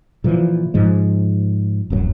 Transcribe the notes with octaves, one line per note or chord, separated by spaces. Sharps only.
A#2 D3 E3 F3
G#2 F3 G#3
D1 F#2 F3 F#3